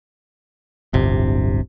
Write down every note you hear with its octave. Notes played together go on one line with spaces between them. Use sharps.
D1 G1 C3